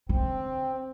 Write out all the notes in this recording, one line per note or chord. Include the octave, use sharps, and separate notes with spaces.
D3 C4